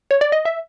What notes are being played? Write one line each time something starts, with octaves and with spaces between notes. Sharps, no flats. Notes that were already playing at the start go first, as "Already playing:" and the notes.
C#5
D5
D#5
E5